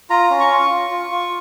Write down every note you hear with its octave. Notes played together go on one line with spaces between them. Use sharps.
F4 A#5
C#4
C#6
F4
F4
F4
F4